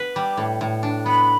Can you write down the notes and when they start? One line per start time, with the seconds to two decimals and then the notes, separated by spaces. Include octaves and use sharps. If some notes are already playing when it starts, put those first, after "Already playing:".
Already playing: B3 B4
0.16 G3 D6
0.37 A2
0.61 A2
0.83 D4
1.05 B3 B5